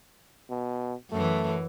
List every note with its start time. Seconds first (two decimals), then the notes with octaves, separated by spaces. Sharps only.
0.49 B2
1.12 F#2 E3 A3